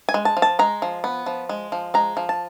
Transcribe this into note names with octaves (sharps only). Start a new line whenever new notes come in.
G#5
G#3
A5
F3
A5
G#3 A#5
F3
B3
F3
G#3
F3
G#3 A#5
F3
A5